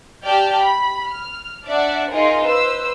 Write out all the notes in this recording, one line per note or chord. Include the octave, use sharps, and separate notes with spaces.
G4 D5 G5 A5 F6 G6
B5
F6
D4 D5 E5 F#5
D#4 F4 G#4 A#4
B4 C5 E6